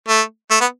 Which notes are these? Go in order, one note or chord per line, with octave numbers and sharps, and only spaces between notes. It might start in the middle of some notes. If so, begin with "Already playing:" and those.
A3
A3
B3